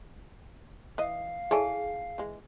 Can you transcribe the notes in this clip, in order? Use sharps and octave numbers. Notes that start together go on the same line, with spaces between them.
E3 D#5 F5
E4 G#4 A4 C#5 G#5 A5
E3 G#3